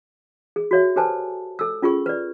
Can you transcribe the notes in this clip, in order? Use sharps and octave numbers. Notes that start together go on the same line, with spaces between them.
G#4
F#4 C#5 E5
G4 A4 B4 C5 G#5 A5
A4 E6
C#4 F4 G#4 C#6
B4 D5